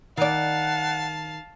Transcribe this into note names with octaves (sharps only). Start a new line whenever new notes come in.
D#3 D5 F5 F#5 A5